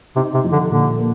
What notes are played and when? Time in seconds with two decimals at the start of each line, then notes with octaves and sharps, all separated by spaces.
0.16 C3 D#4
0.34 C3
0.44 F3
0.53 D3
0.70 A#2 D3
0.98 A#3